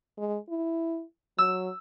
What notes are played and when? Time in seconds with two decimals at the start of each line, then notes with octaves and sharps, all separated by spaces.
0.18 G#3
0.49 E4
1.38 F#3 E6